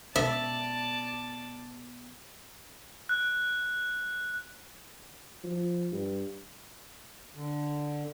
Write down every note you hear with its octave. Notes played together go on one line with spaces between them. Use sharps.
B2 D5 E5 A5
F#6
F3
G2
D3